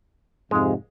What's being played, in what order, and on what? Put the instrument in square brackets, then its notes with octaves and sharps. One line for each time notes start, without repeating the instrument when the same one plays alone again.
[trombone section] F2 G#2 C3 [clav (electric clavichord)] G#3 F5